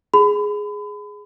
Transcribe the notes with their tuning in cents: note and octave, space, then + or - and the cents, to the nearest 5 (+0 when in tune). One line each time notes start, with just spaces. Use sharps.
G#4 +0 B5 +35